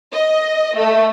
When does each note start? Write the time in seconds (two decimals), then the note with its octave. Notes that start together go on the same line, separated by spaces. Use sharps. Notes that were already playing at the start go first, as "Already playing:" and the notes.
0.13 D#5
0.76 A3